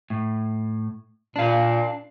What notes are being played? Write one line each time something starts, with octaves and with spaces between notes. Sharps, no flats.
A2
A#2 D4 F5